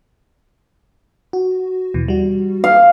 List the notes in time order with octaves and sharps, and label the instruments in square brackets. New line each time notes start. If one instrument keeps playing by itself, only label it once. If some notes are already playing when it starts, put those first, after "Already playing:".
[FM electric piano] F#4
D#2 B2 E3
G3 F#4
[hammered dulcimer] F5